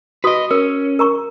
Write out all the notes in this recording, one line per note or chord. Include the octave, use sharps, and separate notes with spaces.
F#4 B4 D#5 D#6
C#4 A#4
A#4 A#5 C#6